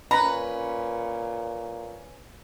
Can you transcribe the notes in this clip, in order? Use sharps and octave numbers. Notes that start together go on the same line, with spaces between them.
A#2 C#4 B4 A#5 B5